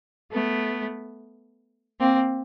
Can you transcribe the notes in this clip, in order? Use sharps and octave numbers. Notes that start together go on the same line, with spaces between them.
A3 B3
A#3 C4